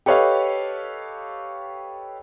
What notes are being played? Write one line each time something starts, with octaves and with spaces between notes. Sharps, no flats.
G4 A4 B4 C#5 D#5 F5